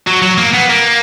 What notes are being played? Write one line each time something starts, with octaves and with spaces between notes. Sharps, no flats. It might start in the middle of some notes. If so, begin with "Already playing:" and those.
F#3
F#3
A#3
B3
A#3